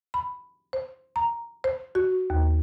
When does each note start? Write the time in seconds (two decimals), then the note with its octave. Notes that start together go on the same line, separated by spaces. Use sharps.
0.14 B5
0.73 C5
1.16 A#5
1.64 C5
1.95 F#4
2.30 D#2